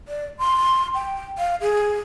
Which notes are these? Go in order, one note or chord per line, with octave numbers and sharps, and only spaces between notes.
D5
C6
G5
F5
G#4